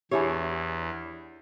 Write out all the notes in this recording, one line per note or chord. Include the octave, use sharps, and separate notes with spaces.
E2 D4 E4 G4 G#4 C#5 G#5